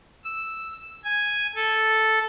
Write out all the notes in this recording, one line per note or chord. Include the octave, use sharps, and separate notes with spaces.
E6
G#5
A4